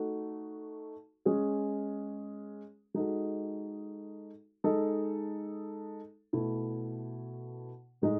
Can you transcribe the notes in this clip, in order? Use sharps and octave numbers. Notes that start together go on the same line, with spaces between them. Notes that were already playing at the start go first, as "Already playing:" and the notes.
Already playing: A3 D#4 F#4 A4
G#3 C#4 G#4
G#3 D#4 F#4 A4
G#3 D#4 A4
B2 A3 E4
A2 G#3 D#4